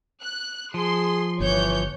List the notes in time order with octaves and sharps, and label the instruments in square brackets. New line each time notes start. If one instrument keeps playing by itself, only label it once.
[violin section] F#6
[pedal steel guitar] F3 [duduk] G#4 [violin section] C6
[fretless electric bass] G1 [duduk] E3 [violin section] C#5 G6